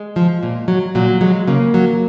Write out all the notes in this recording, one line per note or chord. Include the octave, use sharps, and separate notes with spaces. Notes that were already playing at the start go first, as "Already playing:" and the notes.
Already playing: G#3
F3
A#2
F#3
A#2 F#3
F#3 G#3
C#3 A#3
F#3